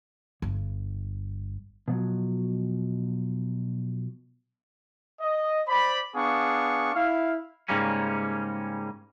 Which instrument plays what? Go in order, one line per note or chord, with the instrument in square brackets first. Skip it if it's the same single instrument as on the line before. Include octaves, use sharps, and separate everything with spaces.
[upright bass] G1 G2
[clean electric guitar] B2 F3 F#3
[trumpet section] D#5
C5 D5 B5
B3 D4 G#4 F5 C#6
E4 F5
[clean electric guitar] G#2 C#3 G3 A#3 C#4